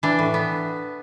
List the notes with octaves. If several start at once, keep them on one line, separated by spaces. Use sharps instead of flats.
E3 D4
A2
B3